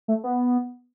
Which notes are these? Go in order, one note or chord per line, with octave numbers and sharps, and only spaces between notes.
A3
B3